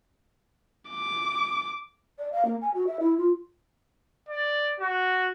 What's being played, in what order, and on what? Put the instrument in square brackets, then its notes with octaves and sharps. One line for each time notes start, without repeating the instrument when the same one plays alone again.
[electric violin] D6
[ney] D5
F5
A#3
G#5
F#4
E5
E4
F4
[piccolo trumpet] D5
F#4